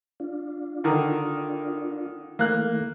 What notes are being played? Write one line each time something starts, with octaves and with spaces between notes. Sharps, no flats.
D4 F4
D3 D#3
E3 A3 A#3 F#6